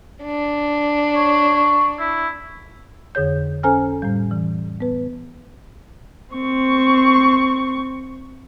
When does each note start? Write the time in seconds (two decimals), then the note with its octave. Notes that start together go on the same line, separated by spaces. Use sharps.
0.24 D4
1.15 C#5
1.56 C#6
1.99 E4
3.15 F2 D3 G#4 C#5 G6
3.63 C#4 A4 C5 G#5 A#5 F6
4.02 A2 G3
4.31 E3
4.80 B3 B4
6.34 C4 C#6